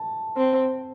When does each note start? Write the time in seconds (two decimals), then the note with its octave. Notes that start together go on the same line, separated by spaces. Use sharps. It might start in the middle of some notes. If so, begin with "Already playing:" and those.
Already playing: A5
0.37 C4